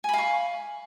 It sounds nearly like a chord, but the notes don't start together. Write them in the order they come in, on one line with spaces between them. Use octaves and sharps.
G#5 B5 F5 C#6